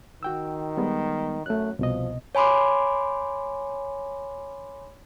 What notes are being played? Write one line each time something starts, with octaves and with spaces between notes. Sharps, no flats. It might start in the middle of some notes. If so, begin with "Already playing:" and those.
D#3 F#4 G5 E6
G3 G#3 B3
F#2 A3 F#6
C2 B2 F3 D#5
C#5 G#5 B5 C6 D6